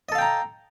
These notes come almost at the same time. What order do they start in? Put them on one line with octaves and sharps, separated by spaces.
D#5 A4 F5 G5 A#5